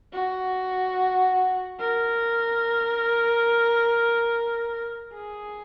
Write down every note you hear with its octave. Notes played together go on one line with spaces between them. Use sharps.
F#4
A#4
G#4